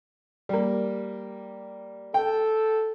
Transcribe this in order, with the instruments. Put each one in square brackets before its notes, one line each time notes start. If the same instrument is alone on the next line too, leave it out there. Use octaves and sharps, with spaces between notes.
[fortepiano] G3 A#3
[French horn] A4 [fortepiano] G5